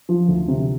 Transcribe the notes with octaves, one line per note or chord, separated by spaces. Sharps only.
F3
D2
C3